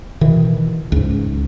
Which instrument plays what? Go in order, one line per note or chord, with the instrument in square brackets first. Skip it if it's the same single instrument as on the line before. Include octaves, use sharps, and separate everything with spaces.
[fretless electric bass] B2 D#3 E3
C#2 G#2